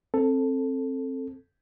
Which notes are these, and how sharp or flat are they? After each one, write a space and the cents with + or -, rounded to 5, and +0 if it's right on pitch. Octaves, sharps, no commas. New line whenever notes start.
C4 +20 A4 +5